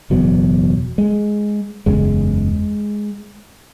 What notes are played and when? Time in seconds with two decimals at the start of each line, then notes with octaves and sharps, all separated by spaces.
0.10 F#1 E2 B2 F#3
0.98 G#3
1.86 F#1 E2 C#3 G#3